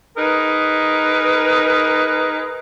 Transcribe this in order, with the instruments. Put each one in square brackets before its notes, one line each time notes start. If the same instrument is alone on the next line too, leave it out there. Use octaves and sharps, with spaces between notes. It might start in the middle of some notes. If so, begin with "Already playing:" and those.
[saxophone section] D#4 G#4 A#4 B4